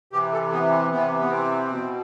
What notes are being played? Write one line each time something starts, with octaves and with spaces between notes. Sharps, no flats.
C3 E3 G4
A4
B3
C3 E3 B3
B3
C4
B2